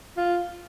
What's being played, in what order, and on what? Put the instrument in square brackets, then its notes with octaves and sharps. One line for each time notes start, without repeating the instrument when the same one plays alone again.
[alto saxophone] F4